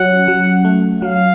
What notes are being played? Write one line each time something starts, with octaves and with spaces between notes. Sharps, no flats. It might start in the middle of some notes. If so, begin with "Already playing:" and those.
Already playing: F#3 C#4 F#5
F#3
A3
F#3 F5